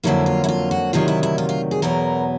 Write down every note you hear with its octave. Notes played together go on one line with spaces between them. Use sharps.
F2 D3 F#3 A#3 E4
F4
E4
F4
F#4
D2 C3 D#3 F#3 F4
E4
E4
F4
F4
G#4
E2 B2 F#3 B3 A#4